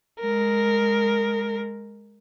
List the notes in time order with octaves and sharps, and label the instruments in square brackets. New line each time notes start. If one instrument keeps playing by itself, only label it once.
[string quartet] G#3 A#4